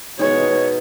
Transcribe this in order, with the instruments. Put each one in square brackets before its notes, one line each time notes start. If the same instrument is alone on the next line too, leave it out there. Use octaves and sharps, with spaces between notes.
[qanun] B2 G#3 D#4 [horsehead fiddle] C#5